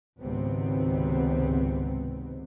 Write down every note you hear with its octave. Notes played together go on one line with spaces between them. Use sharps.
G#1 C#2 G#2 C3 B3 C4